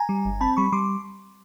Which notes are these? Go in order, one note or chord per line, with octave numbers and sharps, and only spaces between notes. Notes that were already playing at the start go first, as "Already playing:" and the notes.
Already playing: G#5 A#5
G3
G1
C4 A5 B5
G3 B5 C#6
G3 C6 D6